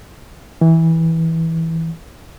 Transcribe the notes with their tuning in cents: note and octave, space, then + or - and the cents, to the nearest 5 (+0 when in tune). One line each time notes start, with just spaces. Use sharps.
E3 -15